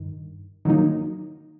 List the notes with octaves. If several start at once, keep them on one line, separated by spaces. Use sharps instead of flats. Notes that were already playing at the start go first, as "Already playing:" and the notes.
Already playing: G2 D#3
D#3 F#3 A#3 D#4